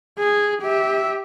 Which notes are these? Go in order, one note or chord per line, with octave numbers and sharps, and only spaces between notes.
G#4
G4 E5